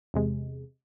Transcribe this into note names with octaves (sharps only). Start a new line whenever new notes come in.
E2 C3 G#3